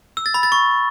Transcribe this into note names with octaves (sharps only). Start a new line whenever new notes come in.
E6
A6
B5
A6
C#6